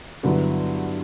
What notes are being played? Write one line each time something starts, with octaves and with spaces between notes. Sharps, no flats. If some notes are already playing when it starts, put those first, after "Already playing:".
G2 D3 F#3 B3 E4